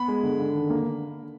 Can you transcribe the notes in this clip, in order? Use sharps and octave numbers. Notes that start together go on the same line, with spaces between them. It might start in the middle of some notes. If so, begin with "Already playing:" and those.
Already playing: B3 B5
G#3
D3
D3
D#3
A#3